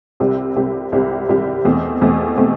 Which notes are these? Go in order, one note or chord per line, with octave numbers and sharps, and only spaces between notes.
C2 C3 G3 C4 G4
C2 C3 G3 C4 G4
C2 C3 G3 C4 G4
C2 C3 G3 C4 G4
E2 B2 A3 C4
E2 B2 A3 C4
B2 A3 C4